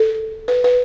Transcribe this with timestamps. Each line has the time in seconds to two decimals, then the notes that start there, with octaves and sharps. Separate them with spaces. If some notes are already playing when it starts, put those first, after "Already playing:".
Already playing: A4
0.48 B4
0.64 B4